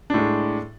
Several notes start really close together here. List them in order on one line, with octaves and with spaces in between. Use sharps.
D4 A2 G#3